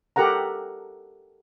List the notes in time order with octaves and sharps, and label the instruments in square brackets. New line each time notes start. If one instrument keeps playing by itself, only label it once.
[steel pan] G4 A4 A#4 F#5 A#5